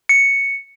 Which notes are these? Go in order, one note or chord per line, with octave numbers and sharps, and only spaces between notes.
C#7